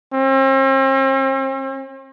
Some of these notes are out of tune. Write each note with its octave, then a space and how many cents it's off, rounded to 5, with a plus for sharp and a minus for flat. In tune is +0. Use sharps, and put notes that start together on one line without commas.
C4 +45